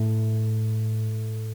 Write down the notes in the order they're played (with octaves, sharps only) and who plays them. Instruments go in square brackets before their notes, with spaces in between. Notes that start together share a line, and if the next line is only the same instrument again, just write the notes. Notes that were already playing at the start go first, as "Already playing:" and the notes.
Already playing: [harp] A2